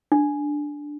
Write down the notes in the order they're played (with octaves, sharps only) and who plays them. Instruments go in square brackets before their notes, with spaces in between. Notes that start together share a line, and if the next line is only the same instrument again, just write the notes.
[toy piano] D4